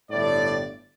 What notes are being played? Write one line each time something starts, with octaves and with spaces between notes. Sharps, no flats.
G1 A2 D5